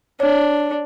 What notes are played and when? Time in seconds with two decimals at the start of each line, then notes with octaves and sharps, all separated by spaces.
0.20 D4 C#5